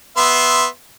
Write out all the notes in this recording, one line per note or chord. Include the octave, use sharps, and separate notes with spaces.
B3 E5 C6